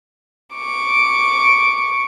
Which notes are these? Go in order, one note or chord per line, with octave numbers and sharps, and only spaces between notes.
C#6 D6